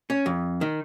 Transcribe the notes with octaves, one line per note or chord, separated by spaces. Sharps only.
C#4
F2
D#3